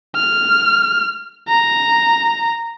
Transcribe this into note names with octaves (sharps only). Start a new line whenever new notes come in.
F6
A#5